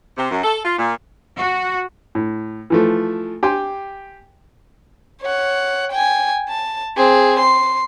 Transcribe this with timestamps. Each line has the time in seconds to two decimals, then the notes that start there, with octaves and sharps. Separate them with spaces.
0.18 C3
0.31 F#2
0.44 A4
0.65 F4
0.78 A#2
1.38 F#4
2.15 A2
2.70 E3 F3 A3
3.43 G4 G5 G#5 C6
5.22 C#5 F#5
5.92 G5 G#5
6.48 A5
6.97 C4 G#4
7.39 C6